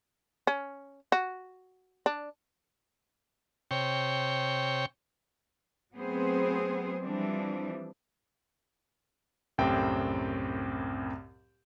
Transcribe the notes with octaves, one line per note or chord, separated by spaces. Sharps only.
C#4
F#4
D4
C3 C#5 G5
F#3 A3 B3 C4 G#4 C5
E3 F3 G3 C4 D4
C2 F#2 A2 C4 G5